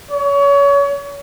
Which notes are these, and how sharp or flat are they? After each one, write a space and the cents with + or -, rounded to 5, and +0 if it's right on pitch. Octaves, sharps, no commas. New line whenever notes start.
C#5 +30